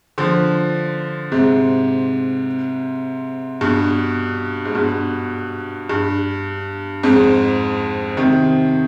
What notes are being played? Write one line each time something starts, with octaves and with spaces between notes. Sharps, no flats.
D3 F3
G#2 C3
G2 B2
G#2
G2 B2
G2
F2 G#2
C3 D#3